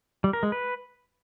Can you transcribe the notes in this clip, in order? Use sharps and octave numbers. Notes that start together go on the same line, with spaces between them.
G3
A#4
G#3
B4